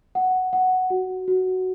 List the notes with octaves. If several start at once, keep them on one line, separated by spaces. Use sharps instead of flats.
F#5
F#5
F#4
F#4